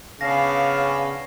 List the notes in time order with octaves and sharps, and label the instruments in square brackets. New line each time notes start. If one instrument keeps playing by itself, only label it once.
[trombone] C#3 [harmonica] B3 C#4 D4 [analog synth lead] F5 [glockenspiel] A#6 C7